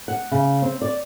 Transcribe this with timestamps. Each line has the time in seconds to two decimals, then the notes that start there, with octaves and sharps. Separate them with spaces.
0.08 F#5
0.31 C#3
0.62 C4
0.82 D5